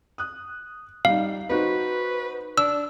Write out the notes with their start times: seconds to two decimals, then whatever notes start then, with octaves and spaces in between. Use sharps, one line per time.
0.18 D#6 F#6
1.05 G3 D#4 F5
1.50 D#4 F#4 B4 C5
2.58 D4 E6